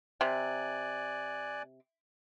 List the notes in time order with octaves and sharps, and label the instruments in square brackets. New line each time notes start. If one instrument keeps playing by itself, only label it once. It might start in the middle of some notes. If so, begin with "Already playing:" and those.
[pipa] C3 [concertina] D5 G#5 F#6